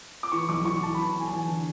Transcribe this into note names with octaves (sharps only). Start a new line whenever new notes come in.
D6
E3 C#6
B1 D6
E3 C#6
B1 A5
E3 B5
A5
B1 G#5
A5
E2 G#5
D3